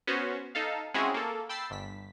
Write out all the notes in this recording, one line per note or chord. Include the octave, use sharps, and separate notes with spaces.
B3 C#4 F#4 C5
D#4 A4 F5
G#3 C4 C#4 E4 F#4 G#4
A#3 A4
G5 B5 E6 A6 C7
G1 B6